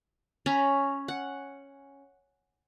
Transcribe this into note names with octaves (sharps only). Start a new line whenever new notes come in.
C#4 A#5 B5
F#5